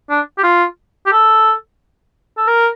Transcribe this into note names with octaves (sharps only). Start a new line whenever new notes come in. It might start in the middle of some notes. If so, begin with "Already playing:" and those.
D4
G4
F4
G4
A4
A4
A#4